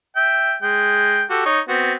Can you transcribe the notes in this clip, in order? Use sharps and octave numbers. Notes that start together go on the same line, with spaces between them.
E5 G5
G#3 G5
F#4 G4 A4
D#4 C#5
B3 C4 F#4